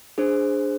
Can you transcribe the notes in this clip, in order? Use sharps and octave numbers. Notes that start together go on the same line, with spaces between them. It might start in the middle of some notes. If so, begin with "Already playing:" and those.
D4 G#4 C5